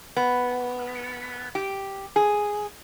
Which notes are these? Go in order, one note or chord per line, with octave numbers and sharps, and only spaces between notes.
B3
G4
G#4